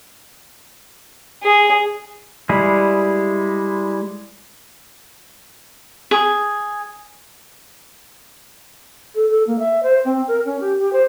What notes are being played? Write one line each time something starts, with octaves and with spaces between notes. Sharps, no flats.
G#4
G3 G#3 E4 G#4
G#4
A4
A4
A#3
E5
C5
C4
A#4
C#4
G4
G4
C5